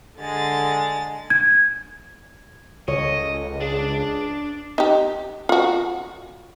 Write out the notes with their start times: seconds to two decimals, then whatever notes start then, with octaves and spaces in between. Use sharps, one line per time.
0.21 D3 G#3 A6
1.30 G#6
2.88 C#2 A4 C#5 D#5
3.60 D4 G#4 D5
4.78 D#4 G4
5.49 F4 F#4